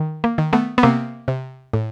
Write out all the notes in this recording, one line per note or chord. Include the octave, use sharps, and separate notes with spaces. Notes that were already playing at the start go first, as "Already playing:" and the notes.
Already playing: D#3
A#3
D#3
A3 B3
B3
C3 A#3 C4
C3
A2